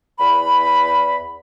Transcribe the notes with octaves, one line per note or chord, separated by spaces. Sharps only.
E2 B5